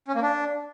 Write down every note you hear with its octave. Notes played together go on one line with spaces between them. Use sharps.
C#4
A#3
D4